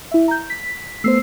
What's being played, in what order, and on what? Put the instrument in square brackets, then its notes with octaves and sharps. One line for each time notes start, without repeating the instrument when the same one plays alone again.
[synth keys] E4 E5
A#5 G6
B6
[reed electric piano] A3 B3 C5 [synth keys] E6 C7